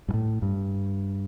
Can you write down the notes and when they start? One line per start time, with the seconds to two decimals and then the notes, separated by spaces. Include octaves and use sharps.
0.08 G2
0.14 A2
0.42 G2